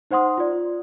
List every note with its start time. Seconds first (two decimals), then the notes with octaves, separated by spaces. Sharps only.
0.11 D#4 C5 F#5 C6 D#6
0.38 F4 D5